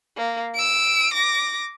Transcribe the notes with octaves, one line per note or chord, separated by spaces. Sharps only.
A#3
E6 D7
D6 A#6